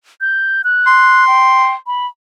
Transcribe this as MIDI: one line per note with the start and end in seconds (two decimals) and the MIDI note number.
0.21 0.62 91
0.64 1.27 90
0.87 1.75 84
1.27 1.75 79
1.87 2.07 83